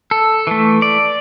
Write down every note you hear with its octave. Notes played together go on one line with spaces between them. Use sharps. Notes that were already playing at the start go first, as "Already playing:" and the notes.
A4
E3 A3
D5